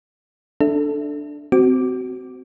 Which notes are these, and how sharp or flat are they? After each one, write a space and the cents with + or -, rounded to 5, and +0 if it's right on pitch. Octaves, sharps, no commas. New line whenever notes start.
D4 +0 A4 +0 E5 +0
C4 -20 F#4 +20 D6 +0